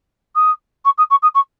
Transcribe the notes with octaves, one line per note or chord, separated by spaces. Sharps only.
D#6
C#6
D#6
C#6
D#6
C#6